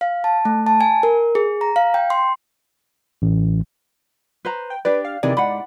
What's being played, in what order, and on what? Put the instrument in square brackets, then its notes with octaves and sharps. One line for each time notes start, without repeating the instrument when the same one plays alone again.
[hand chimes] F5
A5
A3
A5
G#5
A#4
G#4
A#5
F5
G5
C6
[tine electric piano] A1
[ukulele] B4 C5 A#5
[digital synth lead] G5
[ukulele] D4 G4 D5 [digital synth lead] B4
[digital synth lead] F5
[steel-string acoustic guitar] C3 D#3 E3 [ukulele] G#4 [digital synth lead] D5
[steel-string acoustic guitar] G#2 [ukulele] F#5 B5